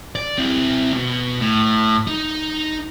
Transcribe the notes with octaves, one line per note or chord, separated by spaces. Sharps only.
D5
C4 E4
B2
A2
D#4